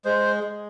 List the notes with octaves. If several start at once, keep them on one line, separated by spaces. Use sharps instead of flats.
G#3 C5
G#3